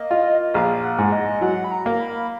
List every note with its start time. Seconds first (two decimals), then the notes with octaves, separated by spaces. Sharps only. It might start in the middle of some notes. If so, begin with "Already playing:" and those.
Already playing: A#3 D#5
0.11 F4
0.54 A#1 F5
0.83 F#5
0.98 G#2
1.12 D#5
1.41 F#3 F#5
1.64 B5
1.72 A#5
1.86 A#3
2.00 B5